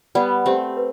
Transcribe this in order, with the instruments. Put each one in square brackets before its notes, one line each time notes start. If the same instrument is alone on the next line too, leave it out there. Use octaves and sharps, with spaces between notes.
[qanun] G3 B3 [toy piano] D5 F#5
[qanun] A3 C4 [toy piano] G4
[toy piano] B4